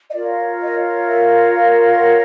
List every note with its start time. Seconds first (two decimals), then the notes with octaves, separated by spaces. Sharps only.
0.09 D#5
0.14 F4 A#4 C#5 D5
0.61 D#5
1.06 E5
1.52 F5
1.98 F#5